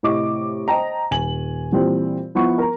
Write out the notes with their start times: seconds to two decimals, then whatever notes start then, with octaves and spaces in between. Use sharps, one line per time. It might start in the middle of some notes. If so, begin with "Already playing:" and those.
0.03 A2 C3 E4 D#5 C#6 D6
0.68 C5 D#5 G5 A5 A#5
1.11 D#1 G#5 F#7
1.72 A#2 E3 G3 C4
2.35 F3 B3 E4 F#5 C#6
2.58 A#4 A#5